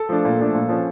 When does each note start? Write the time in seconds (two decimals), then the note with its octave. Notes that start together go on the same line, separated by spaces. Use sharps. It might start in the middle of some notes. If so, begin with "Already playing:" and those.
Already playing: A4
0.09 F3 A3 D4
0.25 A#2
0.39 F3 A3 D4
0.55 A#2
0.69 F3 C#4